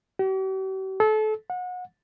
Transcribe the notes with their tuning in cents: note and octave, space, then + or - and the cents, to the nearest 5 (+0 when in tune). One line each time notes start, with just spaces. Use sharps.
G4 -45
A4 -30
F#5 -30